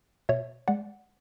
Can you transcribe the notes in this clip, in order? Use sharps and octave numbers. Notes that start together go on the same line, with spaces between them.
B2 C#5 E5
G#3 D5 F#5